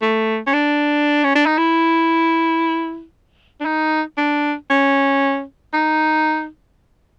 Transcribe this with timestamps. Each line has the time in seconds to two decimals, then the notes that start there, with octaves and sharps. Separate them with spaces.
0.02 A3
0.47 C#4
0.53 D4
1.24 C#4
1.35 D4
1.46 D#4
1.58 E4
3.60 D4
3.65 D#4
4.18 D4
4.70 C#4
5.73 D#4